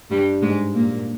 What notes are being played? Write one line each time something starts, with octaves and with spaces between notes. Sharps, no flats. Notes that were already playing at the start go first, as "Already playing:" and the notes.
G2 G3
G#2 G#3
A#2 A#3